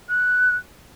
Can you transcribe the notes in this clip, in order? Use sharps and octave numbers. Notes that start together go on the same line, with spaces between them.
F#6